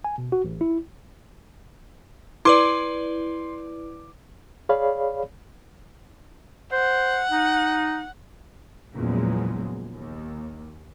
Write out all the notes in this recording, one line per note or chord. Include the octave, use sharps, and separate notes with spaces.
G#5
B2
F#4
A1
E4
E4 B4 D5 C6 D6
G#4 C#5 D5 F5 B5
C5 F#5
D#4
E2 A#2 C#3 F3 F#3 G#3
D#2